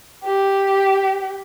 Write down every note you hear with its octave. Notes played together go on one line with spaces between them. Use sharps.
G4